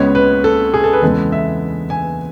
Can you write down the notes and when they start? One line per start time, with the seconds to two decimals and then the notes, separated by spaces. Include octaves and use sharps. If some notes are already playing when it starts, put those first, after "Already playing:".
Already playing: C#2 C#3 G#3 B3 C#5
0.15 B4
0.44 A4
0.74 G#4
0.84 A4
0.93 B4
1.02 E2 C#3 G#3 B3 A4
1.32 E5
1.90 G#5